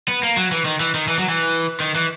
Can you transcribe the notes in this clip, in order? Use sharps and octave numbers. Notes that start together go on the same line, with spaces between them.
B3
A#3
F#3
E3
D#3
E3
D#3
E3
F#3
E3
D#3
E3